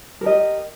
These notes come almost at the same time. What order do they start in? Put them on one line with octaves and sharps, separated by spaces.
A#4 G4 D#5